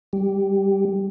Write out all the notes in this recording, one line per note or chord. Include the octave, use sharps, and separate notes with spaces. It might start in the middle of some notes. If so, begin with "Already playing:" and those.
G3